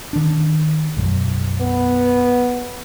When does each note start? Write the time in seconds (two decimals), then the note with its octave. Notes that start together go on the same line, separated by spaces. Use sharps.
0.13 D#3 D4
0.97 B1 F#2
1.61 B3